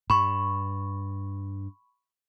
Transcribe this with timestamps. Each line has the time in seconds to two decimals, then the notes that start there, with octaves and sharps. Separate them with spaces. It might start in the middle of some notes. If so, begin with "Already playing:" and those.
0.10 G2 B5 C#6